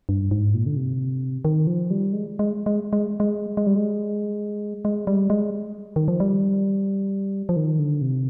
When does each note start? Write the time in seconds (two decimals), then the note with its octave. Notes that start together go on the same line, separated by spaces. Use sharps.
0.09 G2
0.31 G#2
0.54 A#2
0.66 D3
0.77 C3
1.45 D#3
1.67 F3
1.90 G3
2.13 G#3
2.39 G#3
2.66 G#3
2.93 G#3
3.20 G#3
3.57 G#3
3.67 G3
3.76 G#3
4.85 G#3
5.07 G3
5.30 G#3
5.96 D#3
6.08 F3
6.20 G3
7.49 F3
7.56 D#3
7.79 D3
8.02 C3